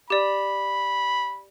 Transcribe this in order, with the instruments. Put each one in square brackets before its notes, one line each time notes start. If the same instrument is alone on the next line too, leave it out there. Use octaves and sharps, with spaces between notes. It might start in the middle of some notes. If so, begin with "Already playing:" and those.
[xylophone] G4 D5 [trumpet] B5